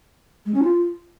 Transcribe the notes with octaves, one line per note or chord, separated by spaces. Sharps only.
G#3
C#4
F4